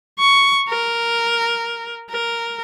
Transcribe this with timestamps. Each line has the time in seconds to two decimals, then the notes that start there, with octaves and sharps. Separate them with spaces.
0.20 C#6
0.69 A#4
2.11 A#4